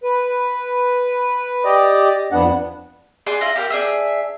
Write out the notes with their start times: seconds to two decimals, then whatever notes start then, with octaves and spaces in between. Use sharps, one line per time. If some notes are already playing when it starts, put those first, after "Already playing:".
0.03 B4
1.65 G4 D5 D#5
2.32 F2 B3 D4 F#5
3.26 G#4 D5 C6 F#6
3.41 E4 F4 A#5
3.56 G4 A#4
3.70 D4 G#4 E5